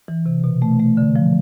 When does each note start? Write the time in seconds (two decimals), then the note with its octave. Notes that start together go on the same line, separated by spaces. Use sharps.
0.08 E3
0.26 C3
0.44 B2
0.62 A3
0.80 A3
0.97 D3
1.16 F3